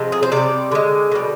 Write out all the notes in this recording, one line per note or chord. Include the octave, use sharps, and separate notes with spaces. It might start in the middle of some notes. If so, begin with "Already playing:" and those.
Already playing: C3 F3 G#3
G#4
C5
C3 G3 D5
D3 G#3
B2 G3